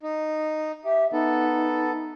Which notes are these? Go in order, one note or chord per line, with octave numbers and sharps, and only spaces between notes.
D#4
G4 E5
B3 D#4 A4